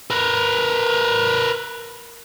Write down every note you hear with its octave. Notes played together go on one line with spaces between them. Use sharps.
A#4 B4